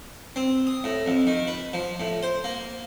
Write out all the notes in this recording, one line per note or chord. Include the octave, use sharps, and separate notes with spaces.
C4
D#6
A2
F2
D#3
B4
F3
A2
C5
A#3